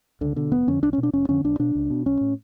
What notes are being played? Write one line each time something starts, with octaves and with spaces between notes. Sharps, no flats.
C#2 D3
B2 D3
F1 B3
F2 D3 C#4
B1 D4
C#4
B2
D4
F1 C#4
F2 D3 C#4
B1 D4
B2 D4
C#2
B2
B1 C#4
A2